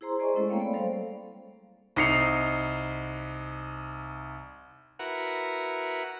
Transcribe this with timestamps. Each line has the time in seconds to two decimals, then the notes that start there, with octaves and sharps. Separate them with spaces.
0.01 E4 G#4 C5 A#5 C6
0.19 G#4 C5 D5 D#5 G#5 C#6
0.34 G#3 A3 C#4 E4 A4
0.48 A3 A#3 C4 C#5 F5 G5
0.60 D5 B5
0.73 F#3 G3 A4 C5 F5
1.96 C2 D#4 C7 C#7 F7
4.99 E4 F#4 A#4 B4 F#5